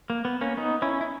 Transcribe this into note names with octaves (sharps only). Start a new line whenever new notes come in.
A#3
B3
A#3 C#4
B3 D#4
C#4 E4
E4